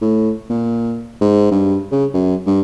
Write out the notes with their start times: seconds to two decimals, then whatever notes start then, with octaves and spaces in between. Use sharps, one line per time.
0.02 A2
0.49 A#2
1.21 G#2
1.51 G2
1.91 C#3
2.14 F#2
2.46 G2